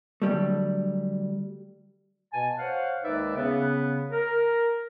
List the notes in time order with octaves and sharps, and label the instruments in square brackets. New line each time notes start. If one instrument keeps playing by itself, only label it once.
[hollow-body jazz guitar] D3 F#3 G3 A3
[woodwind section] B2 G#5 A5
C5 C#5 F5 F#5
D#2 G#3 D#4 B4 D5 E5
C#3 B3
A#4